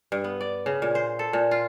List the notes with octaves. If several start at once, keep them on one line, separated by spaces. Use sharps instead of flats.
G2
B3
D5
C#3
A#2
C5
A4
A#2
F4